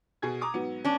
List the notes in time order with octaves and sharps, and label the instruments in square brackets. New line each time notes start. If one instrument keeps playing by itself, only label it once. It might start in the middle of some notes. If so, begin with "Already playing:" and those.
[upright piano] B2 G#4 G#6
A#5 D6 D#6
G#2 F#3 B3
[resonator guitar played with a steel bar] C#4 D4